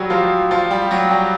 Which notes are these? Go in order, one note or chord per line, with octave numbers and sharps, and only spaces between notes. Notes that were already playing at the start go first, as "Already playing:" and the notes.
Already playing: F#3 G3 F#4 G4
F3 F4
F3 F4
G3 G4
F#3 F#4
G3 G4